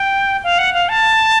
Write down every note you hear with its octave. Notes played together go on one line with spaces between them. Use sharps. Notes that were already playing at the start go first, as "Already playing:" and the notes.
Already playing: G5
F5
F#5
F5
A5